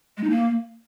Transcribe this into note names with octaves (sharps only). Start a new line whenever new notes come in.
G#3
D#4
A#3